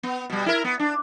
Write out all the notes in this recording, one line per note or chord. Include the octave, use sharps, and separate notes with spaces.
B3
B2 G3
E4 A#4
B3
D4